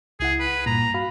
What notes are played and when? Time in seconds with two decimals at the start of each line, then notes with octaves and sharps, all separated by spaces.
0.20 C#2 E4 G#4 F#5
0.39 B4
0.51 B6
0.66 G2 A#2 A#5
0.94 F#4 F5 B5